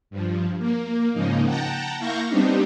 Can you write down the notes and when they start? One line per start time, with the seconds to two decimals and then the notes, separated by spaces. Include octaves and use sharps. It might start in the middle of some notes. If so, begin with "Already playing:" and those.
0.10 G2 F3
0.59 A#3
1.13 G#2 C#3 F3 A#3 D#4
1.44 F#5 G5 A5 A#5
1.99 A#3 E4 F5 C#6 G6 A#6
2.29 G3 B3 C4 D4 D#4 G4